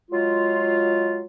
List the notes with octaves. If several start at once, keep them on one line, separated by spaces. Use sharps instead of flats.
F#3 G#3 F4